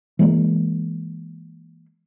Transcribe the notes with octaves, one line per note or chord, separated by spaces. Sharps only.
E3 G#3 A#3